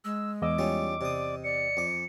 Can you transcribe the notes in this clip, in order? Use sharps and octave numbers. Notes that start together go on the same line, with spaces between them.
G#3 E6
E2 D#5 D6 E6
G3 C#4 F4
C3 D5 D#6
D5 C#7
F2 D6